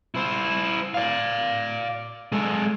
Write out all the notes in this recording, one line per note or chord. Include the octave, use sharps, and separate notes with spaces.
E4 C5
D5 F5
G#3 A4